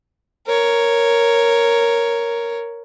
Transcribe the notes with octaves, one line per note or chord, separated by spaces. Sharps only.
A#4 C#5